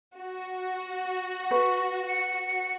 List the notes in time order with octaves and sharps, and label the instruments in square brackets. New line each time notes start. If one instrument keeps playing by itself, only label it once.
[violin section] F#4
[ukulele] B4 [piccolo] C#6
[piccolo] C#7